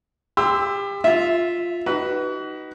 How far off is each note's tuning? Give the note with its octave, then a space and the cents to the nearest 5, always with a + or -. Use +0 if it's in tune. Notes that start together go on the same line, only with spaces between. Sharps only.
G4 +30 C6 -20 E6 +0
F4 +0 E5 +0
D#4 +0 F#4 +40 B4 +0